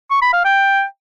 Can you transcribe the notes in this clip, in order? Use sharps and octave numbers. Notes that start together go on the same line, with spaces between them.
C#6
B5
F5
G5